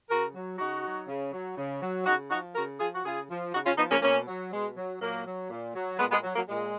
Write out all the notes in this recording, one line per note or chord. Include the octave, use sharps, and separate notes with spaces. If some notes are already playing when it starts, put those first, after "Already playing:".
C#3 F#4 A#4
F#3
C#3 D#4 F#4
F#3
C#3
F#3
C#3
F#3
C#3 D#4 F#4
F3 D#4 F#4
C#3 F#4 A#4
F3 F4 G#4
F#4
C#3 F4 G#4
F3
C#3 D#4 F#4
C#4 F4
F3 B3 D#4
A#3 C#4
B2 A#3 C#4
F#3
B2 G#3
F#3
A#2 F#3 A#3
F#3
A#2
F#3
A#2 G#3 B3
G#3 B3
F#3
F#3 A#3
A#2 G#3